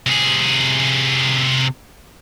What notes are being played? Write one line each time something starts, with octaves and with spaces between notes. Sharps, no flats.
C3 G#4